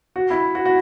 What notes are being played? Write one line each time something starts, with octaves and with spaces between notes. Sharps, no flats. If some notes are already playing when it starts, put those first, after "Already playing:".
F#4
E4
F#4
F#4